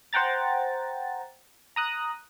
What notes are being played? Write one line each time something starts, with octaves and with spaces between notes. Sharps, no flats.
C5 F#5 G5 A#5 A6
A#5 D#6 F#6